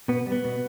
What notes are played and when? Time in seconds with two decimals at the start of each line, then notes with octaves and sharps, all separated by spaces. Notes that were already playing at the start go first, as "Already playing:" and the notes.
0.08 B2 B3
0.27 G3
0.32 B3
0.45 B2